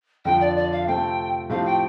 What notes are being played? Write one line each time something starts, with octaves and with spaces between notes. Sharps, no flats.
F2 D3 F3 D4 F4 G5
D5
D5
F5
C3 A3 C4 F4 A4 G5
A2 F3 A3 C4 G4 F5
G5